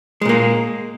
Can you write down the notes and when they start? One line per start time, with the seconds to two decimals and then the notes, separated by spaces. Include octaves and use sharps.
0.21 G#3
0.25 A#2
0.29 A#3